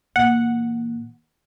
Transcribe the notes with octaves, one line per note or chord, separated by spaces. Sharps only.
A#2 E3 F#5